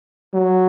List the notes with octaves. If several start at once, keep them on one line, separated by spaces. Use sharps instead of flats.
F#3